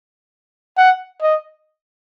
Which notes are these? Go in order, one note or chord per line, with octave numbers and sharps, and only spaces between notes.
F#5
D#5